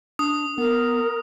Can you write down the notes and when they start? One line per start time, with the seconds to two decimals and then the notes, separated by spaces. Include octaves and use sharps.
0.19 D4 D#6
0.58 B3 A#4